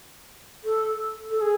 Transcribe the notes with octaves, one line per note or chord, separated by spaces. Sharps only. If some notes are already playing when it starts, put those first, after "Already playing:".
A4
A4
G#4